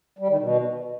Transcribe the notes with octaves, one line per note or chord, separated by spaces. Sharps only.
G3
D#3
B2